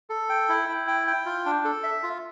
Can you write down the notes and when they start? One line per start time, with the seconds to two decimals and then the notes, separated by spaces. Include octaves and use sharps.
0.10 A4
0.29 G5
0.49 E4
0.69 E4
0.88 G5
1.07 G5
1.26 F4
1.46 D4
1.65 A4
1.83 E5
2.03 F4